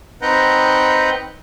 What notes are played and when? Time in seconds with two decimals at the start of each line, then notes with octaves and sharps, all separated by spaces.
0.22 C4 D#4 B4 F#5 G5 A#5